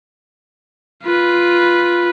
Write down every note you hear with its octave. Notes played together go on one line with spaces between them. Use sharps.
F4 B4